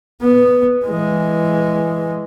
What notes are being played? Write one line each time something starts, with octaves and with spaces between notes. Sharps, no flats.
B3
E3 G#3